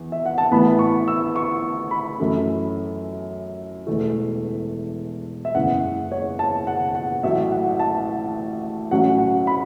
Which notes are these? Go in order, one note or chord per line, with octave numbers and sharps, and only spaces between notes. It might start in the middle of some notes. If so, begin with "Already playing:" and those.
Already playing: E2 E3
E5
F#5
A5
A1 A2 E3 B3 B5
C#6
E6
C#6
B5
F#2 E3 A3 C#4
E1 E2 E3 A3
E5
F#1 E2 C#3 F#5
C#5
A5
F#5
F#5
A1 A2 F#3 E5
F#5
A5
A1 A2 F#3 C#4 F#5
F#5
B5